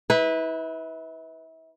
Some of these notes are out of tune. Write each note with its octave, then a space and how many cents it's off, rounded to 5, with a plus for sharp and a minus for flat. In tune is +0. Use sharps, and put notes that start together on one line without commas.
E4 -35 B4 +0